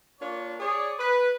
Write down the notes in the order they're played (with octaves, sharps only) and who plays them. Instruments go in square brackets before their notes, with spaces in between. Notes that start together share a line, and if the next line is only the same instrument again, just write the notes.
[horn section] A#3 D4 F4 C#5
G#4 C#5 D5
B4